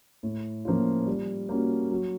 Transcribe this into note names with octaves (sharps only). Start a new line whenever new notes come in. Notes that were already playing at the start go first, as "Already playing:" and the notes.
A2
F3 A#3 C#4 F4
G3
A#3 C#4 F#4
F#3